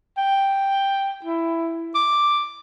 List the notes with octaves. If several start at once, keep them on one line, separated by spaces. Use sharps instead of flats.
G5
E4
D6